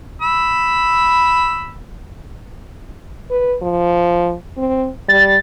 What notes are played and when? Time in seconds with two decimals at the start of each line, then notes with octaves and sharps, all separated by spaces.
0.22 B5 E6
3.30 B4
3.62 F3
4.57 C4
5.09 G3 A6